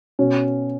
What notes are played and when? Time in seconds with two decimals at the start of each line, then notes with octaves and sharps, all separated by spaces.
0.19 B2 C#4